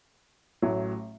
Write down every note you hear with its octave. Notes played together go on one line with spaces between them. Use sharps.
A1 A2 F#3